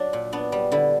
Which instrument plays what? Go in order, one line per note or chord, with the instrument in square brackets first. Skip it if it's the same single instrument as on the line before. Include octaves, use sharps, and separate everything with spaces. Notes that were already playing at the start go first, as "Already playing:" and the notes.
Already playing: [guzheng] F#3 D4
A#2
B3 D4
G3
D3 E4